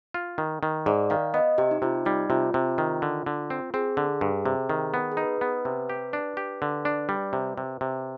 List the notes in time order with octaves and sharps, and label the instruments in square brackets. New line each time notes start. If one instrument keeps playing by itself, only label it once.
[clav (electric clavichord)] F4
D#3
D#3
[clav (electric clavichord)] G#2 [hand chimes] D5
[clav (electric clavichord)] D#3 [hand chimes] F5
[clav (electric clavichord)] B3 [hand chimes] D#5
[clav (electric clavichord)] C3 [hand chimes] G4
[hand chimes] D#4
[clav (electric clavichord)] C3 [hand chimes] F4
[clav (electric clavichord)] G3 [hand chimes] D#4
[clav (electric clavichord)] C3 [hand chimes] F4
[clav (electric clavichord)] C3
D#3
D3
D3
C4
[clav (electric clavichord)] C4 [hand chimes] G#4
[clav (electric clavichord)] D3
G2
C3
D#3
B3
[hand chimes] G#4
[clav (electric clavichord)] D#4 [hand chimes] B4
[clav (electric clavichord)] B3
C3
G4
D4
G4
D3
D4
G3
C3
C3
C3